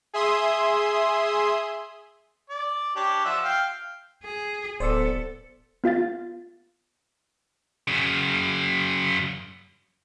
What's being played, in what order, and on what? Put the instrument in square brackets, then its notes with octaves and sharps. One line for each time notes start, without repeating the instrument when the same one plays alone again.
[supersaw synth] G#4 E5 C6 D#6
[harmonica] D5
D4 G4 C#5
F3 E5 F#5
F5 G5
[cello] G#4
[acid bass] D1 [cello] B3 A4 [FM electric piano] C5 D5 E6
[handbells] B3 F4 F5 A6
[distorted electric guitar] F#2 C#3